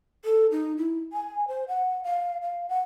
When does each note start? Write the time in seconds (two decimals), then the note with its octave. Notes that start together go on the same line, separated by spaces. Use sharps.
0.25 A4
0.51 D#4
0.78 E4
1.13 G#5
1.48 C5
1.68 F#5
2.04 F5
2.42 F5
2.69 F#5